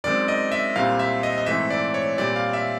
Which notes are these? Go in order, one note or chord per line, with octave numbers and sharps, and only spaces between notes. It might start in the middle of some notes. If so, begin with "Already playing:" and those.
F#2 D#3 G#3 C4 D5
D#5
E5
C2 A#2 G3 C4 F5
E5
D#5
D#5
G#2 E3 A3 C4 E5
D5
C#5
A#2 G3 C4 D5
F5
E5